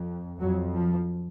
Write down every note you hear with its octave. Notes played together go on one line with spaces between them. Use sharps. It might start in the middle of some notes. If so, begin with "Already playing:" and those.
Already playing: F2
F2 F#3
F3